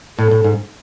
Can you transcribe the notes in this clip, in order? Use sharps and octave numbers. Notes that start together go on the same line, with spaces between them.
A2 A4
A2
G#2